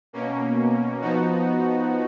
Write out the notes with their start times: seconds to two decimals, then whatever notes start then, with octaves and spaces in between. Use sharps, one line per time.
0.13 B2 A#3 C#4
1.01 F3 B3 D#4 F#4